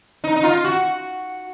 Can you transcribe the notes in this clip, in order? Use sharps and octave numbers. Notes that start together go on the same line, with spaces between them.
D#4
D#4
F4
F#4